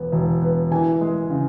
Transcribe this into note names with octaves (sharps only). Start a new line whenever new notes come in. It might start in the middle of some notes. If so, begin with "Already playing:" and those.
Already playing: E1 B3
E1
B3
E3 G#5
G#3
C#3